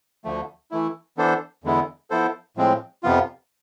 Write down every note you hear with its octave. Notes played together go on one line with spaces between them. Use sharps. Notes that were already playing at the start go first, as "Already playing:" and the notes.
D2 D3 F3 A3
E3 A3 E4
E3 B3 D4 A4 C5
E2 D3 G#3 B3 E4
F3 B3 E4 A4 C5
A2 F3 G#3 C4
F2 C3 F3 B3 F4